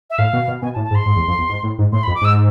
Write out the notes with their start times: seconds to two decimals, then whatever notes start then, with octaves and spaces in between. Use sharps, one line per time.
0.10 E5
0.18 A2 F5
0.33 B2
0.48 B2
0.62 B2 G#5
0.73 A5
0.76 A2
0.84 A5
0.91 G#2
0.95 C6
1.06 G#2
1.16 E2
1.28 F2
1.38 E2
1.49 G#2
1.63 A2
1.78 G#2
1.92 A2 C6
2.03 B5
2.07 F2
2.15 D6
2.22 G#2 E6